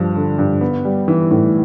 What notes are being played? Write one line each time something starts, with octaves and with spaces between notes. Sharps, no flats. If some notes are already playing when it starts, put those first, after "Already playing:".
Already playing: G2 F3
D3
G2
B3
G3
E3
A2